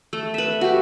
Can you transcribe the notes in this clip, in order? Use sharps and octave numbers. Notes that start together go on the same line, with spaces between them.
A3
B4 E5
F#4 G4